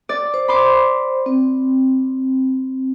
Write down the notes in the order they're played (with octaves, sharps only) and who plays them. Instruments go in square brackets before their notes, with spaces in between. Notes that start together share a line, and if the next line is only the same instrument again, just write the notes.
[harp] D5
[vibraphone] C5
[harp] B5 C6 D6
[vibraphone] C4